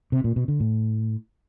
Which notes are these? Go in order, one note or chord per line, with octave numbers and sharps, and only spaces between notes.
C3
A#2
B2
D3
A2